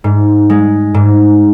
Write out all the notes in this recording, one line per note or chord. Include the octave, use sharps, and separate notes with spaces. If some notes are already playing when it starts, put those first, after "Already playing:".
G#2
G#3
G#2